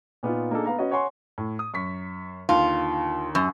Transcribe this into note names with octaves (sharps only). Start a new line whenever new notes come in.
A#2 B3 D#4 F4
A#3 D4 D#4 G#4 A4
B3 F5 A#5
C#4 F#4 B4 D#5
C#5 F#5 G#5 C6 C#6
A2
D#6
F#2 C#6 B6
D#2 D3 F4
F#2